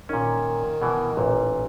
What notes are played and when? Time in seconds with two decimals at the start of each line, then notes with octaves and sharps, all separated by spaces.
0.09 A#2 D#3 C#4
0.82 B2 E3
1.17 A1 A#2